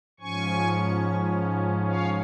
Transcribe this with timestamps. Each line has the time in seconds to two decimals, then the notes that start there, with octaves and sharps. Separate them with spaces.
0.20 G#2 F3 C#4 G#5 C#6
1.85 C#5 F5